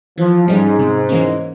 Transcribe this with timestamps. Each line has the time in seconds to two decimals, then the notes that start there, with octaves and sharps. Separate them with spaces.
0.18 E3 F3
0.48 G#2 G3 C#4
0.79 C3
1.09 E3 A#3 C#4